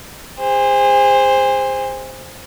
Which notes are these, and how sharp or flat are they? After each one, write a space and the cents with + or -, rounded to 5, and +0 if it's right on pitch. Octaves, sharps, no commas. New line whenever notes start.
G#4 -35 C5 +0